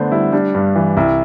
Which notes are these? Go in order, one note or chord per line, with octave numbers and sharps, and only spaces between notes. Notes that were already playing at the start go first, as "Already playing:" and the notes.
Already playing: D3 A3 B3 D4 C5
G3 E4
G3 D4
G2
E3
C2 E4